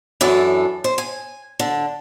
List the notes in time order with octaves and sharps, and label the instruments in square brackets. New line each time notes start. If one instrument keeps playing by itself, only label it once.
[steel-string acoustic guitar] F#2 E3 D4 A4
C5
G#5
D3